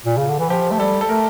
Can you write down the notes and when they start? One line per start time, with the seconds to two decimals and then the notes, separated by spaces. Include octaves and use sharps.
0.06 A#2
0.18 C#3
0.29 D3
0.39 E3
0.49 F3 G4
0.71 A3
0.80 G3 A4
1.01 A4
1.09 A3 A#4